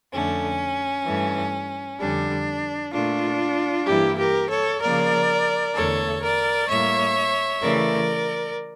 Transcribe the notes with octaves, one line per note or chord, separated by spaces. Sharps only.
F2 D3 A3 C#4
G2 E3 A3
F2 D3 G3 D4
A#2 A3 D4 F4
G2 E3 G3 A#3 E4 G4
G4 A#4
A4 C#5
C#3 F3 A#3 A#4 D5
E2 D3 A3 A4 C#5
A#4 D5
A2 G3 A#3 C#5 E5
C#3 E3 A3 A#4 D5